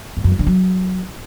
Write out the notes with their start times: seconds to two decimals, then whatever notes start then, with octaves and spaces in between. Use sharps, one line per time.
0.17 G2
0.24 F#2
0.32 G3
0.39 D3
0.47 F#3